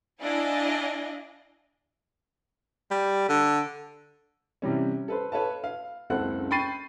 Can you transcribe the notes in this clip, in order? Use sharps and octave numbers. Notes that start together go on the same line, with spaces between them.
D4 E4 D5 D#5 F5 G#5
G3
D3
C3 E3 G3 C#4
A4 B4 C5
A4 B4 C#5 F5 A5
F5
F#1 C#2 C4 A4 F#5 F#6
G5 B5 C#6 A6 C7 D#7